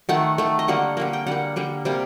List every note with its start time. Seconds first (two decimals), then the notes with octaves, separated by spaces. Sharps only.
0.09 D#3 A3 F#5
0.38 D#3 A3
0.59 D#5
0.68 D3 G3 A#3 F#5
0.97 D3 G3 A#3
1.13 G5
1.27 D3 G3 A#3 F#5
1.56 D3 G3 A#3
1.85 C3 G3 A#3